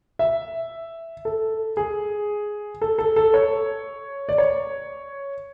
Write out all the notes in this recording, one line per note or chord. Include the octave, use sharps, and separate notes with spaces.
E5
A4
G#4
A4
A4
A4
C#5
D5
C#5